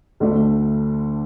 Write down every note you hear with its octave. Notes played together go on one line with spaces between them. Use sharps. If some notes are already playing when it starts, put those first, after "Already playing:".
D2 D3 A3 D4